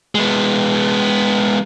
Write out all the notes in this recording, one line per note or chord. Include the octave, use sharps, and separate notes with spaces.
G#3 B3